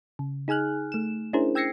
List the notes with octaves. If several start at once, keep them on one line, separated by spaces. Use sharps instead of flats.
C#3
D#4 G#4 G#5 F6 F#6
A3 E7
C#4 D4 E4 G#4 A#4 C5
G5 E6 G#6 A#6 C7 C#7